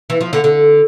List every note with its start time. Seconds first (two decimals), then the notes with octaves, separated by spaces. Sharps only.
0.10 E3
0.21 F3
0.33 D3
0.44 D3